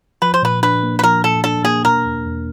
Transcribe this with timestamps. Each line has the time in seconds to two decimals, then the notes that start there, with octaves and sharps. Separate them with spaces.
0.22 F3 B4
0.34 C5
0.42 A#2 B4
0.63 D4 B4
0.83 A#3
0.99 B4
1.03 F3 A#4
1.24 A#2 A4
1.44 D4 A4
1.64 A#3 G#4
1.85 B2 A#4
2.05 E2
2.26 E2